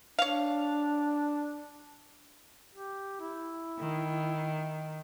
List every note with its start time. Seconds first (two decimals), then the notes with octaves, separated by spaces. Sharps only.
0.19 D4 C#5 F5
2.75 G4
3.20 E4
3.80 D#3